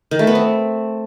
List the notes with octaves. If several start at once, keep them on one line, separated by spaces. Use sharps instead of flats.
D#3
A3
B3
C4